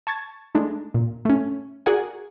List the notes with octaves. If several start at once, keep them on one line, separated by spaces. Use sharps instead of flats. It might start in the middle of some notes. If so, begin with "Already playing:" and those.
A5 C#6 G#6 A6
G#3 A3 D4 D#4
A#2
A3 C#4
F#4 G#4 A#4 D5 F#5 G#5